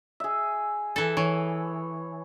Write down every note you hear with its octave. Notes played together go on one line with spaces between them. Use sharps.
G#4 E5
E3 A4
E3 C#5